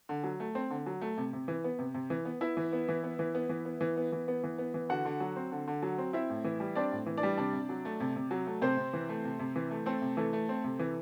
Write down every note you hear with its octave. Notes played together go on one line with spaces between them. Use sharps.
D3
F#3
A3
C4
D3
F#3
A3
C3
C3
E3
B3
C3
C3
E3
B3
B3 E4 E5
E3
B3
E3
B3
E3
B3
E3
B3
E3
B3
E3
B3
E3
B3
E3
D3 F#4 F#5
D3
F#3
C4
D3
D3
F#3
C4
C4 E4 E5
A2
E3
G3
C4 D4 D5
A2
E3
D4 D5
G3
C3 D4 D5
C3
F#3
A3
C3
C3
F#3
A3
C3 C4 C5
C3
E3
A3
C3
C3
E3
A3
A3 C4 A4
C3
E3 A3 A4
A3
C4
C3
E3